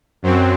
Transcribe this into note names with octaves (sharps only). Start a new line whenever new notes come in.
F#2 F#3 C4